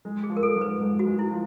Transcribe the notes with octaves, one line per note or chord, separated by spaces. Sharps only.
G#3
G#4
F3
A#4
A4
G#2
B4
G#2
F#4
G#3
E4
F3